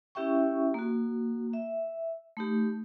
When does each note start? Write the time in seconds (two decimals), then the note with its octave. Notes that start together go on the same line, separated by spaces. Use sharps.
0.15 C#4 E4 G4 E5 G5 C#6
0.74 A#3 F#4
1.53 E5
2.37 A3 D#4 G4